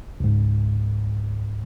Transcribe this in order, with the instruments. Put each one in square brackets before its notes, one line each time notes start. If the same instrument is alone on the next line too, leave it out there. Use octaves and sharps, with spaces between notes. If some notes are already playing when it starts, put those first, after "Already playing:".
[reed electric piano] C#2 G#2